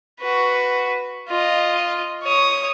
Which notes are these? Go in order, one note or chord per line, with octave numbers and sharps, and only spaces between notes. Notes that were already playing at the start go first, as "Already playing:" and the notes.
F#4 B4
F4 D#5
C#5 D#6